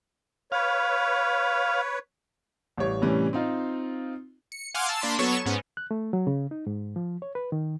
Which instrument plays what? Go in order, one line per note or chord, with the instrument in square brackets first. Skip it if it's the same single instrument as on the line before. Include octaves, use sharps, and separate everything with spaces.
[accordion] B4 C#5 [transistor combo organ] F5
[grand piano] A1 G3 C#5
A2 C3 E3 G3 C#4
C4 D#4 F4
[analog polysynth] C#7
F5 F#5 G#5 C6 D6 F6
A5 E6 A6
A#3 D4 B5 C6
F#3 B3 A4 C#5 C#6 E7
G#2 B3 C#4
[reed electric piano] F#6
A3
F#3
C#3
D#4
G#2
F3
C#5
B4
D#3